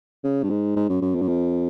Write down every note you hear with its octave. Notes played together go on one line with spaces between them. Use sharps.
C#3
G2
G#2
G#2
F#2
F#2
F2
F#2
F2